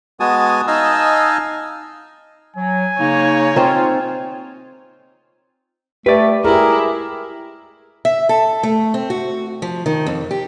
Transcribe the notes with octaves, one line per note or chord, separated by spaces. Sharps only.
G#3 B3 F#4 G#5 A5 D#6
D#4 D#5 F5 G#5 A5 E6
F#3 G#5
C#3 A#3 D#4 C#5
C4 D#4 F4
A3 G4 B4 D5
E4 G4 G#4 A#4
E5
A4
A3
C4
F#4
F3
D#3
F2
G4